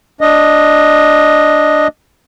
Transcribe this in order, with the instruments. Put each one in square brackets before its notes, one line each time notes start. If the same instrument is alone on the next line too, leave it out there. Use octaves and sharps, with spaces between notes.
[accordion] D4 D#5